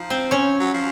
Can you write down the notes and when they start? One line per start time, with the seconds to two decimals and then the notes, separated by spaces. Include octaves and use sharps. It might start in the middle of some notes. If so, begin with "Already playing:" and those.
Already playing: F3 D#4
0.10 C4 C5
0.31 C#4 C#5
0.60 F#3
0.74 F3